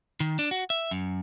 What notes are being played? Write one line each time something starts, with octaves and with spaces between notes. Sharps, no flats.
D#3
D4
F#4
E5
F#2